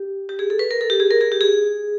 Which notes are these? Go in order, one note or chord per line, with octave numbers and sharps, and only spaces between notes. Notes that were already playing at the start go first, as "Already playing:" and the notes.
Already playing: G4
G4
G#4
A4
B4
A#4
A4
G4
G#4
A#4
G#4
G4
G#4